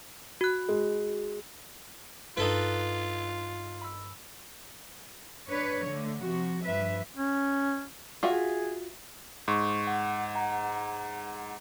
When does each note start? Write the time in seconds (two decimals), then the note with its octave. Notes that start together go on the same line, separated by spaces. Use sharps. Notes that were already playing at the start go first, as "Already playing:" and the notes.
0.41 F#4 F#6
0.69 G#3
2.37 G2 D#4 F4 A4 B4
3.81 B5 E6
5.50 D4 B4 C#5
5.86 D3 A3
6.22 C3 F3 F#4
6.64 G2 F3 B4 E5
7.16 C#4
8.23 F4 F#4 G#4 E5
9.48 G#2 C6 C#6
9.87 F#5
10.35 F#5 A#5